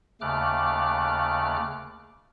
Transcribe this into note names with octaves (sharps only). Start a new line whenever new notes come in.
D#2 C#3 A3 D6 F6 F#6